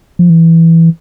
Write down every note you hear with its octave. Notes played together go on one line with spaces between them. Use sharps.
F3
E3